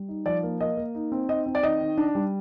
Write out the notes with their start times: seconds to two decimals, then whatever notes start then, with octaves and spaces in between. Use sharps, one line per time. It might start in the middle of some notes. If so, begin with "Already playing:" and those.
Already playing: G3
0.09 D#4
0.26 F3 D5
0.43 A#3
0.61 A#3 D#5
0.77 A#3
0.95 D#4
1.12 C4
1.29 D#4 D#5
1.46 C4
1.55 D5
1.63 D#3 D#5
1.81 D#3
1.98 D4
2.15 G3